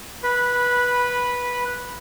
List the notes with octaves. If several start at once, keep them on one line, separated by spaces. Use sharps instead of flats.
B4 B5